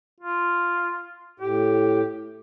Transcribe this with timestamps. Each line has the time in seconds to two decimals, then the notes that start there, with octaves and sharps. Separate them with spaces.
0.20 F4
1.40 A2 G4